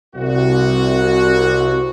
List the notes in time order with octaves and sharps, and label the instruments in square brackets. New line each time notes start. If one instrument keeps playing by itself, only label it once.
[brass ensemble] C2 F#4